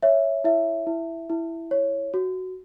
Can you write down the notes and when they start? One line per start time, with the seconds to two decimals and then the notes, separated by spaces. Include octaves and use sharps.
0.03 C#5 E5
0.44 E4 E5
0.87 E4
1.30 E4
1.71 C#5
2.14 F#4